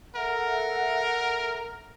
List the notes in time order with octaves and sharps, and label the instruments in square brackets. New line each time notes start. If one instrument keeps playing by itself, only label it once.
[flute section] A4 E5 F#5 [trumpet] A#4